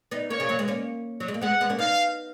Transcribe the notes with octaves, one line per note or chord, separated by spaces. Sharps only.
B3 D#4
A#3 C#4 C#5
C#3 F3
F#3 A#3
G#3 B3
A#3 C#4
F#3
G#3
A#3
G#3 B3 F#5
G#3 B3
A#3 C#4
B3 D#4 F5